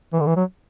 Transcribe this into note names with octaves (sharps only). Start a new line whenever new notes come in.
E3
D3
E3
F#3